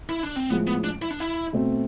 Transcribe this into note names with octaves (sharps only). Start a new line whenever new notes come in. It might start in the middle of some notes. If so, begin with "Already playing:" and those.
E4
D4
C4
A2 F3 G#3 B3
B3
D4
E4
D4
E4
B2 A3 C4